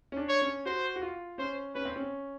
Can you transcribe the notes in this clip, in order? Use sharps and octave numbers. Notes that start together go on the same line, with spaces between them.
C#4
D4
C#5
C#4
F#4 C5
F#4
F4
C#4 C5
C#4 B4
C4
C#4